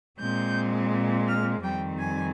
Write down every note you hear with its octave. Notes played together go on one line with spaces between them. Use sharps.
A#2 G#3 C4 G6
F6
F2 D#3 G3 C4 G5
G#5